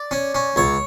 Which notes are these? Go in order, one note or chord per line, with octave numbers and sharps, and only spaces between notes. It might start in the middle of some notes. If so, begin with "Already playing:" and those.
Already playing: D5
C#4
C#4
C#2 C#5